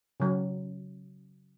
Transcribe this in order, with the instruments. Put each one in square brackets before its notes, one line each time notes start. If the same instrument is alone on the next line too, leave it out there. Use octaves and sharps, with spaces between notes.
[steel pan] C#3 F#3